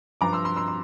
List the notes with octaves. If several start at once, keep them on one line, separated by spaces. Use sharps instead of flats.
G2 F3 A#5 D6
C6 E6
C6 E6
C6 E6
C6